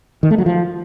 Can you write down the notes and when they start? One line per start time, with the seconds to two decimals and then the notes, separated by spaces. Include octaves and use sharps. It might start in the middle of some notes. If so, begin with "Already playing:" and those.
0.23 D#3
0.31 A3
0.38 F#3
0.46 F3